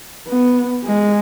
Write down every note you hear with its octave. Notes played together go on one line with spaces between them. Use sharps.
B3
G#3